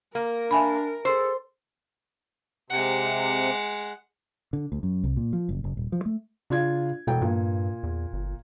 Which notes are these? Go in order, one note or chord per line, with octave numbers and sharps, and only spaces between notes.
A#3 A#4
D4 E5 G#5 B5
G#4 A4 C5
C3 G#3 F#5
D3
D2
F#2
C2
A#2
F3
F#1
F#1
D#1
F3
A3
C#3 D4 F4 G#6
E1 B2 A4 G5
G2 A#2
E2
G1